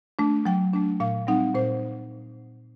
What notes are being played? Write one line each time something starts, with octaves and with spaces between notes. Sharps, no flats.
A3 D4
F#3 G5
A3 D4
A#2 F5
G3 C4 D#4 F#5
A#2 C5